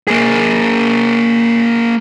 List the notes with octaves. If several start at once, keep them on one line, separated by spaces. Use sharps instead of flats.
A#3 G#4